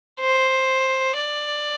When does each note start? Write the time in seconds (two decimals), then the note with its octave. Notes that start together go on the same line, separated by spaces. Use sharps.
0.21 C5
1.17 D5